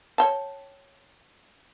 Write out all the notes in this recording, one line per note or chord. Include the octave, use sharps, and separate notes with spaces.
C#5 G5 A5